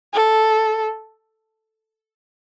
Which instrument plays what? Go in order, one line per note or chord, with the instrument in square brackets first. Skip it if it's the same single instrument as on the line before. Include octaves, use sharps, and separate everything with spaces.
[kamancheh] A4